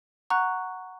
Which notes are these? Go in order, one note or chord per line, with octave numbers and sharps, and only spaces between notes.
F#5 A#5 C#6 F#6